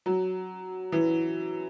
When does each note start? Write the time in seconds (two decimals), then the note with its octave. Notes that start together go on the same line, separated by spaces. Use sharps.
0.06 F#3
0.92 E3